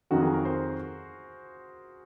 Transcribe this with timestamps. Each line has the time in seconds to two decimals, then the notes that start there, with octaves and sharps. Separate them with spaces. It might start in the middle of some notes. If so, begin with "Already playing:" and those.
0.11 F2 D#3 F#3 F#4
0.22 G#4
0.34 A#4
0.45 C5